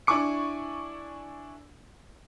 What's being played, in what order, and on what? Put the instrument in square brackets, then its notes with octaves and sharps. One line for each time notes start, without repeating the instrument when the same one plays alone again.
[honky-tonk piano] D4 E4 G#5 C#6 D6 C#7